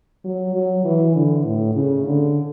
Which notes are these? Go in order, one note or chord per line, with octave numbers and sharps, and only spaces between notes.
F#3
F#3
E3
D3
A2
C#3
D3